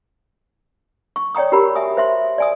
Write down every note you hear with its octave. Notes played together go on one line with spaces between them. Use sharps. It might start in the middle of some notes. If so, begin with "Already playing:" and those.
C#6
C#5 D5 G5 A#5 D#6
F#4 G4 A#4 A#5 B5
E5 G#5 D#6
C5 E5 C6
D5 G#5 D#6